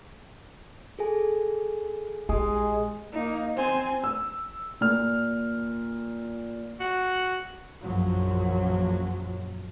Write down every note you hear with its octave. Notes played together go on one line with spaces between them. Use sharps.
G#4 A4 G#5
A#1 G#3 E4 G4 G#5 D#6
A#3 D#4
C4 C5 G#5
E6
A#2 F6
F#4
A#1 F#2 F3 F#3